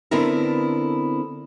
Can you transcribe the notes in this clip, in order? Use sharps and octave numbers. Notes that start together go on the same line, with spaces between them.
D3 B3 C4 E4 A4 A#4